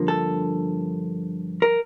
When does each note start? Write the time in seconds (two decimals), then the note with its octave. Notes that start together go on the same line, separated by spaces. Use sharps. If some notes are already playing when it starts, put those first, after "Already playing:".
Already playing: G2 D3 F3 A#3
0.08 A4
1.62 A#4